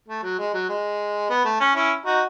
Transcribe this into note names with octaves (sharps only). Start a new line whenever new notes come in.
A3
F#3
G#3
F#3
G#3
B3
A3
C#4
C#4 E4
D#4 F#4